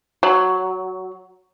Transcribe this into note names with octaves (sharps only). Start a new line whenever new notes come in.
F#3